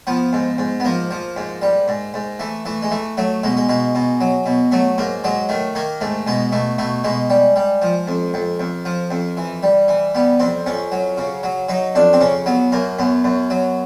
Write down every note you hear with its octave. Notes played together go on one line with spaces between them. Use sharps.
F3 B3
G#2
G#2
B3
F3 A#3
F3
G#2
G3
G#2
G#2
E3 A3
E3 A3
G#3
E3 A3
F#3 A3
B2 G#3
G#3
B2 G#3
B2
F#3
B2
F#3 A3
G#2 A#3
F#3 G#3
D#3 A3
D#3 A#3
G#2 A3
B2 G#3
B2 A3
B2 A3
B2 G#3
G3
G3
F3
F2
F2
F2
F3
F2
E3
G3
E3
G3 B3
F2 C4
F2 C#4
F#3
C#3
F#3
F#3 D#4
F2 D4
C4
C#3 C#4
F#3 B3
F#2 A#3
F#2 B3
F#2
F#3